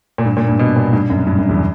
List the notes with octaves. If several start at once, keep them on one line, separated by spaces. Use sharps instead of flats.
A#2
G2
A#2
G2
B2
A#2
G2
F#2
G2
F#2
E2